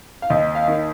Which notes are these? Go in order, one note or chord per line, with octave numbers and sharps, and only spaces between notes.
F5
D#2 D#5
F5
D#3